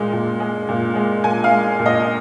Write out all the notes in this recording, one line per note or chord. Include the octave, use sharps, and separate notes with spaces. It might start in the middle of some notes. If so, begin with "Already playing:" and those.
Already playing: A#2 G#3
A#2
G#3
A#2
G#3
A#2 G#5
F5
G#3
A#2
D#5